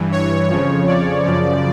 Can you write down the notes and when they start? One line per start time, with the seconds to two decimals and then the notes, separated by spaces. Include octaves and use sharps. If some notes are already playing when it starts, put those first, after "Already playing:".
Already playing: G2 E3
0.12 C#5
0.50 F2 C#3 F3
0.87 D5
1.25 F#2 C#3 F3 D5